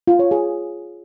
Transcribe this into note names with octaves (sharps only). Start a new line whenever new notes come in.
F4
C#5
G#4